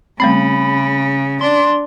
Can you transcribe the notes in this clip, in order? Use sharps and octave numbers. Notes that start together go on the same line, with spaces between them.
C#3 G3 A3 C4 B5
D4 C6